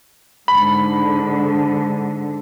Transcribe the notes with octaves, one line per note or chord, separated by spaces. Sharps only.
G#2 D3 B5